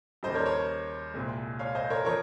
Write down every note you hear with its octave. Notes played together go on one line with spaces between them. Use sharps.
D#2 C#3 G3 C5 D#5
A#4 C#5
A#4 C#5
C2 A#2 G#3
C#5 F5
C5 D#5
A#4 C#5
F3 A#4 C#5